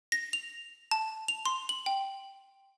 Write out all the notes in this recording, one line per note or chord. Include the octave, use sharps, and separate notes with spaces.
A#6
F7
A5
F7
C6
F#7
G5